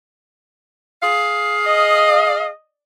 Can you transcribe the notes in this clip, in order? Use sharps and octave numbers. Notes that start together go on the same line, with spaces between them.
G#4 F5
D#5